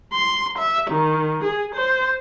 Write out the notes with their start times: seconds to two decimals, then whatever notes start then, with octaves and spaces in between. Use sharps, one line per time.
0.13 C6
0.58 E5
0.90 D#3
1.44 G#4
1.75 C5